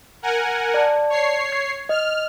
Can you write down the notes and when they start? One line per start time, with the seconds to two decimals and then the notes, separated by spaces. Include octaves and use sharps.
0.22 A#4 F#5 G#5
0.74 D5 A5
1.10 C#5 C7
1.52 G#6
1.89 D#5 F6